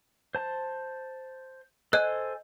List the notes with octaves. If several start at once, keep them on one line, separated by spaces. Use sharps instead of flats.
C5 A5
A4 C5 D#5 G#5 F#6